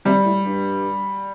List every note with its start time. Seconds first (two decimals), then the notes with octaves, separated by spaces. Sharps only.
0.05 C3 G3
0.25 A2
0.45 G2